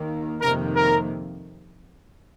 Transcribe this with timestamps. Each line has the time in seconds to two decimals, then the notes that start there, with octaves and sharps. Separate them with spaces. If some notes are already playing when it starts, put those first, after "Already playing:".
Already playing: D#2 D#3 A#3
0.41 F2 C3 D#3 A#3 A#4
0.76 A#4